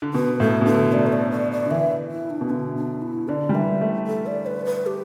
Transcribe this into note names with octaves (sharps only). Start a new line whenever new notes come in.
D3
B2 B4
A2 A4
B2
D3 A4
A3 D5
B4
D5
D5
D5
D3
E3 E5
E4
D4
B2
D3 B3
D4
E4
D3 D5
G3
E3 E5
A3
A4
D5
B4
B4
G4